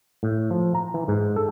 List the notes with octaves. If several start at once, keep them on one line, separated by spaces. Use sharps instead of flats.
A2
F3
A#5
E3
G#2
A4